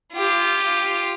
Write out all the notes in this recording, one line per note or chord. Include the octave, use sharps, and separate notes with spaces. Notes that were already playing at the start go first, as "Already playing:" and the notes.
F4 G4